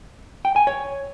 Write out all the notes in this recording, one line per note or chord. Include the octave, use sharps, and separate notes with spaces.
G5
G#5
C#5